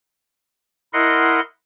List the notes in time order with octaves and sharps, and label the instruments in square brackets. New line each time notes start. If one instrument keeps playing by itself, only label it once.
[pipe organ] E4 A#4 D#5 F#5 C6